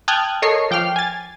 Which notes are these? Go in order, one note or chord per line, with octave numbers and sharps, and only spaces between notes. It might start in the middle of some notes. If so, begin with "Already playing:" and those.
G5 A5 D#6 F6 F#6 G#6
A4 A#4 C#5 D#5 C#6 C7
F3 G5 D6 F6 C7
G#5 A6